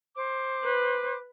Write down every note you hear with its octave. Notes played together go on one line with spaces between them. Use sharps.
C5 D6
B4